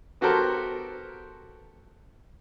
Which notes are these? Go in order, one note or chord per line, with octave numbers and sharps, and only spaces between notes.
B3 F#4 G4 A4 A#4 C5